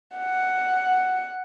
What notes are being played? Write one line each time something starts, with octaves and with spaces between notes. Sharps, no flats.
F#5